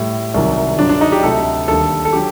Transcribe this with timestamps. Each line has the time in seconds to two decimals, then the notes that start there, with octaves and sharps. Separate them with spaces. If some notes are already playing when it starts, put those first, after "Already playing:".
Already playing: A2 G3
0.34 C2 C3 D#3 F#3
0.78 G2 D3 F#3 D4
0.89 D4
1.01 D#4
1.12 G4
1.23 D2 C3 F#3 A4
1.68 D#2 D3 G3 A4
2.05 A4
2.13 D3 F#3 G4